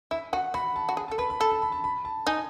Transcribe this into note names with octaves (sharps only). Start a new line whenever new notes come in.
E4 E5
F#4 F#5
F#4 B5
A5
F#4
G#4
A5
A4
B4 B5
B5
A4 A5
A5
B5
A5
B5
A5
D#4 G#5